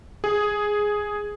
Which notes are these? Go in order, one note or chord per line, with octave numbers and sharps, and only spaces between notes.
G#4